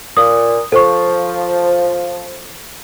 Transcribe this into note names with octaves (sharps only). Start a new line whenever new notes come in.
A#2 D#6
F3 A4 C5 C#6